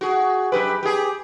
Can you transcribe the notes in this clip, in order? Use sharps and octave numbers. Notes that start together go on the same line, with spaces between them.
F#4 G#4
F#2 G4 B4
G4 G#4